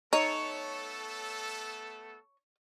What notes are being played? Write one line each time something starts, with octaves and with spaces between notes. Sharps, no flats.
A3 B3 D#4 A4 C#5